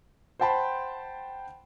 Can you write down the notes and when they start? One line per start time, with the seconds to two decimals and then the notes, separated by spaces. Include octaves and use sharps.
0.40 C5 F#5 G5 A5 B5 C6